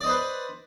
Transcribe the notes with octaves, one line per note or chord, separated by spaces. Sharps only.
B4 C5 D5 D#5